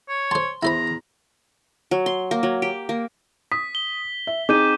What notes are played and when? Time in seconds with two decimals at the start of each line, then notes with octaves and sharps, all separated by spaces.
0.08 C#5
0.31 C5 A5 C6
0.63 E2 E4 C5 A#5 B5
1.91 F#3
2.06 C6
2.31 A#3
2.43 F#3
2.62 G4
2.89 A#3
3.52 D#6 B6
3.75 G7
4.27 E5
4.49 C4 D#4 G#4 D6 G6 D#7